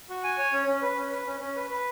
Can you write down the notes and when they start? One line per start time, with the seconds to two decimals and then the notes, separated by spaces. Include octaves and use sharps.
0.09 F#4
0.24 G#5
0.38 C#5
0.53 C#4
0.67 C#4
0.82 B4
0.97 C#4
1.12 B4
1.27 C#4
1.40 C#4
1.56 B4
1.70 B4